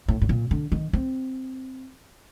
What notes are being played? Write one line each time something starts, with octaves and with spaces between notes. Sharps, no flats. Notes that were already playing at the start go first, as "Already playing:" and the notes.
A2
A2
A#2
D3
D#3
C4